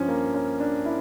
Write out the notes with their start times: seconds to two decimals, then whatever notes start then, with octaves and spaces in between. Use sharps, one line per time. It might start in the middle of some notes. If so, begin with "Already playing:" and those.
Already playing: G2 F3 C#4
0.08 A#3
0.34 C#4
0.60 D4
0.86 E4